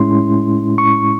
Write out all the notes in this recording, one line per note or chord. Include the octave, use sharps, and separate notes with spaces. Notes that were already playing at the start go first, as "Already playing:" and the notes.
Already playing: A2 G#3 C#4 E4 C6
C#6